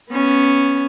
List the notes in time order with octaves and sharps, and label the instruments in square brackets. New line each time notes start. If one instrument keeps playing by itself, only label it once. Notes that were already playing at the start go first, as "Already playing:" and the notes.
[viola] B3 C#4